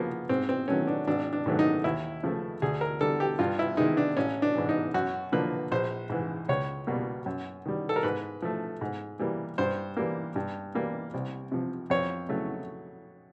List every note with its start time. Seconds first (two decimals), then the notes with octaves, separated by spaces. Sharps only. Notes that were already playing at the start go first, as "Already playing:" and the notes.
Already playing: C#3 F3 A#3 B3
0.29 G#2 C4
0.49 C4
0.68 D#3 F#3 A3 C#4
0.87 D4
1.07 G#1 D4
1.33 D4
1.46 G#2 D#3 F#3 A3
1.59 D#4
1.84 D#2 E4
2.23 C#3 F3 A3
2.62 D2 G#4
2.81 A#4
3.01 D3 G3 A4
3.20 G4
3.39 G2 F4
3.59 E4
3.77 D#3 G#3 D#4
3.97 D4
4.17 A1 C#4
4.42 D4
4.55 G#2 E3
4.69 D#4
4.94 F#2 F#4
5.32 D3 F3 A#3 B4
5.71 A#1 C5
6.09 G#2 E3
6.48 C#2 C#5
6.87 B2 G3 A#3
7.26 F#2
7.65 D#3 G3
7.89 A4
7.96 A#4
8.03 G#2 B4
8.42 F3 A3
8.81 G#2
9.19 E3 G3 A#3
9.58 G2 C5
9.97 E3 G3 A#3
10.36 G2
10.75 E3 G3 A#3
11.14 C2
11.52 C3 F3
11.90 F2 C#5
12.29 C#3 F#3 A3